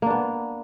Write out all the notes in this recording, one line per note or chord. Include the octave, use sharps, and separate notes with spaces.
A#3 B3 D4